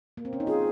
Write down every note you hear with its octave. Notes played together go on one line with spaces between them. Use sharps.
A#3
C4
C#4
D#4
F4 G#4